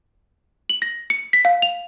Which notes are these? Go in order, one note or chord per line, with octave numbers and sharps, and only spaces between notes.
F#7
A#6
C#7
B6
F5
F7